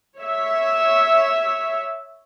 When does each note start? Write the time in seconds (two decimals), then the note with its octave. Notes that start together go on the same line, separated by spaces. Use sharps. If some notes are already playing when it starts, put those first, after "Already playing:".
0.18 C#5 E5